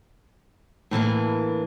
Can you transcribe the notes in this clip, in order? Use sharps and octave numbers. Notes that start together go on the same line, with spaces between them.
A2 E3 A#3 D4